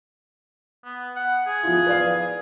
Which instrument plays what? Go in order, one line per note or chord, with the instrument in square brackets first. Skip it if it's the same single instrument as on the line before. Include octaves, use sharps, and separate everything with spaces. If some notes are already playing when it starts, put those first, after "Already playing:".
[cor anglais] B3
F#5
G#4
[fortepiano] F3 E4 F4
B4 D5 F5